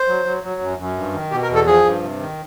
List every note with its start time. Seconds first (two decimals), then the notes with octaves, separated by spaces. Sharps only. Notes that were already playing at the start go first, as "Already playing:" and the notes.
Already playing: C5
0.08 F#3
0.25 F#3
0.43 F#3
0.61 F#2
0.78 F#2
0.97 G2
1.14 D#3
1.31 B2 G4
1.43 A#4
1.49 E2
1.55 A4
1.67 F3 G#4
1.84 G2
2.02 C3
2.19 D#3